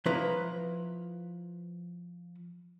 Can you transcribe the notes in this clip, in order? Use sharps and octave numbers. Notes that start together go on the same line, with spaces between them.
F3 E4 B4 A#5